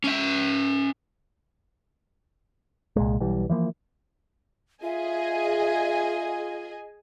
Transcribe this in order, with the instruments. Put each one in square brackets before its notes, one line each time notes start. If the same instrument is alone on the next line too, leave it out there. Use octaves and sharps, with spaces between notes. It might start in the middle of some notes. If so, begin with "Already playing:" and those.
[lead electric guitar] C#4 E5
[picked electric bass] C2 A#2 G#3
B1 E3 G3
E3 F3 A#3
[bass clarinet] F4 [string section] G#4 D#5 G#5 [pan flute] E5